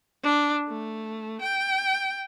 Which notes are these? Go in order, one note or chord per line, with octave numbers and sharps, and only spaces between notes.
D4
A3
G5